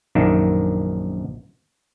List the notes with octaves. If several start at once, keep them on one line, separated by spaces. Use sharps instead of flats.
A#1 F#2 D#3 D4 D#4 E5